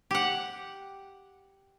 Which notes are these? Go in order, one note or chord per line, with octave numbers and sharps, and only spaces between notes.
G4 F#5